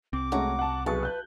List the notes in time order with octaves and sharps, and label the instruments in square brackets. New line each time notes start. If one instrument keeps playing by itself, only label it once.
[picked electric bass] C2 C4 [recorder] D6
[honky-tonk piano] G#3 A3 C#4 [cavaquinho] F#4 A#5
[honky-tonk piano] F#5 A5
[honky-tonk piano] B1 G#4 C#6 [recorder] B4 [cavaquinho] A5
[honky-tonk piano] F#6 G6